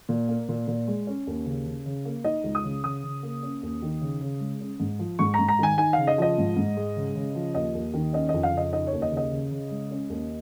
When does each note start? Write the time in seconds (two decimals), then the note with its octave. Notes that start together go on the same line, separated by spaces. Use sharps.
0.09 A#2
0.28 A#3
0.49 A#2
0.68 A#2
0.88 G#3
1.07 C#4
1.27 D#2
1.46 C#3
1.66 C#3
1.86 C#3
2.05 A#3
2.24 D#4 D#5
2.44 C#2
2.55 D#6
2.64 C#3
2.84 C#3 D#6
3.03 C#3
3.23 A#3
3.43 C#4
3.63 D#2
3.82 D#3
4.01 C#3
4.21 C#3
4.40 G#3
4.60 C#4
4.80 G#2
4.99 F3
5.19 G#2 C#6
5.34 A#5
5.39 G#2
5.49 A#5
5.59 D#3 G#5
5.78 D#4 G#5
5.93 C#3 F5
6.07 D#5
6.18 F3 D#5
6.38 G#2
6.57 G#2
6.77 G#3
6.97 C#3
7.16 C#3
7.35 F3
7.55 D#2 D#5
7.75 D#2
7.94 D#3
8.13 C#4 D#5
8.29 F2 D#5
8.43 F5
8.53 C#3 D#5
8.73 D#4 D#5
8.87 C#5
8.92 D#2
9.02 D#5
9.12 C#3
9.17 D#5
9.31 C#3
9.51 C#3
9.71 G#3
9.91 C#4
10.10 D#2